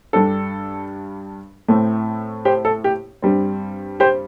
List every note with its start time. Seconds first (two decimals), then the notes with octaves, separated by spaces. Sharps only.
0.13 G2 G3 D4 A4
1.68 A2 A3 C4
2.45 G4 C5
2.65 A4
2.84 G4
3.22 G2 G3 C4
4.00 G4 C5